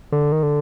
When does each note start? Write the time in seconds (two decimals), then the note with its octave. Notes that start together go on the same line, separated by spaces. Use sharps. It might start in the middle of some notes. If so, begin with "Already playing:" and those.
0.12 D3
0.32 D#3
0.43 D3